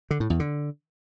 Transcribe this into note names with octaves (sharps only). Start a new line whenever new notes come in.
D3
A2
E2
D3